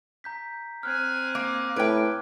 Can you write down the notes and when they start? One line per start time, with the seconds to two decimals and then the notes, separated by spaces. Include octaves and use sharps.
0.24 A#5 G6 B6
0.83 C4 G#5 F6 F#6 G#6
1.35 A#3 D6
1.76 A2 B4 G5 D6 G#6 D7